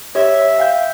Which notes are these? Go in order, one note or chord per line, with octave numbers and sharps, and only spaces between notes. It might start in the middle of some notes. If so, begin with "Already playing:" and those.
G4 C#5 E5
F5 G5 G6